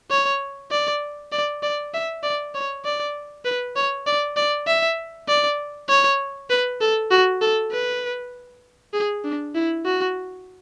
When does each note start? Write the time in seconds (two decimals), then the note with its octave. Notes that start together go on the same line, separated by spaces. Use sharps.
0.11 C#5
0.72 D5
1.32 D5
1.63 D5
1.94 E5
2.24 D5
2.55 C#5
2.85 D5
3.45 B4
3.76 C#5
4.07 D5
4.37 D5
4.67 E5
5.28 D5
5.89 C#5
6.50 B4
6.81 A4
7.11 F#4
7.42 A4
7.72 B4
8.94 G#4
9.24 D4
9.55 E4
9.85 F#4